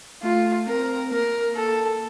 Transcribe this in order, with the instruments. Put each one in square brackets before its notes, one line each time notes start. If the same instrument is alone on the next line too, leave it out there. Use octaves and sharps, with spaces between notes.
[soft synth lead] A3 [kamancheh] F4
[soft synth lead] C4 [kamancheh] A#4
[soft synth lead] A#3 [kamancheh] A#4
[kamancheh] A4